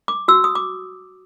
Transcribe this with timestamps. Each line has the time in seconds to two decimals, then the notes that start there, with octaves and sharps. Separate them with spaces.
0.08 D6
0.28 F#4 E6
0.44 D#6
0.55 D6